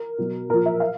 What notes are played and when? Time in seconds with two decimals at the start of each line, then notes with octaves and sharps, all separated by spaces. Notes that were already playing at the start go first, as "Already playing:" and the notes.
Already playing: A#4
0.18 B2 F#3
0.49 A#2 F3 A#4
0.66 E5
0.80 F5